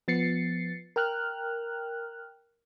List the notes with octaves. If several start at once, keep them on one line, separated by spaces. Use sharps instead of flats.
F3 B3 A6 C7 C#7
A#4 G5 F6 F#6